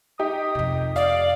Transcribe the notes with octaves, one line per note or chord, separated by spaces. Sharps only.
D#4 G4 D#6
F2 C3
D5 F5